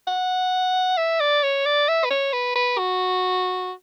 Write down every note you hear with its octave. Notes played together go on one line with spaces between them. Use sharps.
F#5
E5
D5
C#5
D5
E5
B4
C#5
B4
B4
F#4